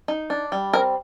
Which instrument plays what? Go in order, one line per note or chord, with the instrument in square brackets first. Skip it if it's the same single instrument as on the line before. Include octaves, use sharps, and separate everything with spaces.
[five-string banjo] D#4
D4
G3
C4 A#4